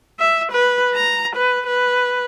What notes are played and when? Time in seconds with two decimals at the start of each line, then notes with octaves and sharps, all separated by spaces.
0.19 E5
0.52 B4
0.94 A#5
1.35 B4
1.66 B4